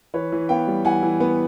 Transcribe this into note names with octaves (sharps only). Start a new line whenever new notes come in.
E3 B4 C#5
E3
B3 F5 G5
G3
E3 F#5 G#5
E3
B3